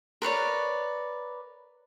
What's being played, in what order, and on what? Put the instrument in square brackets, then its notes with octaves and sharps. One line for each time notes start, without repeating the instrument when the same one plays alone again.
[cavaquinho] A#4 B4 C#5 D5